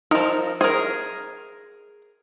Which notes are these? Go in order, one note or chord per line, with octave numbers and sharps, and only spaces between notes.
F3 D#4 A#4
G#4 A#4 C5